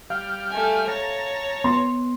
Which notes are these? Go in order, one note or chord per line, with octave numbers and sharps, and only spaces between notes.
G3 F5 G5 F6
A3 G#5
C#5 A5 A#5
B3 C6